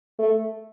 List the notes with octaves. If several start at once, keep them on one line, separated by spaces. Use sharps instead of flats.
A3